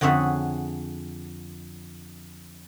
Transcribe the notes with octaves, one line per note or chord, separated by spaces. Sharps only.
F2 D3 G#4 C#5 E5 F#5